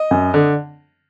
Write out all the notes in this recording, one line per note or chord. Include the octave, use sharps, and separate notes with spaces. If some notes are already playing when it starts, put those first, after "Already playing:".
Already playing: D#5
F#2
D3